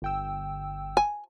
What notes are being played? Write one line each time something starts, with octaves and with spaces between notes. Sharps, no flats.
G1 G5 E6
G#5